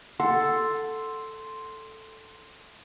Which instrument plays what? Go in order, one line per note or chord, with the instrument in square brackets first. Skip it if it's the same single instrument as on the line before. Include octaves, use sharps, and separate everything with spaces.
[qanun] A4 [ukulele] F#5 [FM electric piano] C6